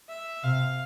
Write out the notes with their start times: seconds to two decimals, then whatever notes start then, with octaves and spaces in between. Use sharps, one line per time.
0.09 E5
0.43 C3 F5